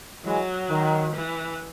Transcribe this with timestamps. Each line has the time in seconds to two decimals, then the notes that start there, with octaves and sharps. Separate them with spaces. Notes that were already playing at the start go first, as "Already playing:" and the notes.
0.25 E3 F#3 G#3
0.70 D#3
1.13 E3